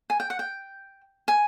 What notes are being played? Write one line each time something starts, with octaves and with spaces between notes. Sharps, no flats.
G#5
G5
F#5
G5
G#5